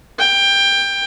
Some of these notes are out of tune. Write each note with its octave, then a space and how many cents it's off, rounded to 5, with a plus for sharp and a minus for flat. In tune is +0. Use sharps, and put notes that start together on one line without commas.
G5 +20